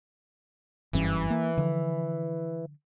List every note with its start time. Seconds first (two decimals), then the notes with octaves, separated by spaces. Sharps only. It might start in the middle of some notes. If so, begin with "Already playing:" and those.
0.93 F#1 G2 E3 C#4
1.30 A#3
1.57 D3 F3